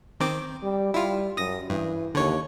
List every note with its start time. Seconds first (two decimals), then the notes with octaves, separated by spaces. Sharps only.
0.20 D#3 C4 D6
0.63 G3
0.94 G3 E4 F4
1.37 F#2 D#6 A#6
1.70 G2 E3
2.15 D#2 D3 C#5